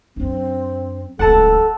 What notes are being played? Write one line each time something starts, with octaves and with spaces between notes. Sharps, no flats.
F#2 C4 D4
D1 C#2 A4 F#5 A5